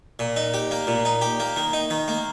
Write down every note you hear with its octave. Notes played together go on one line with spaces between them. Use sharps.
A#2
D#4
G4
A#3
A#2
D#4
G4
A#3
D#3
D#4
D#3
A#3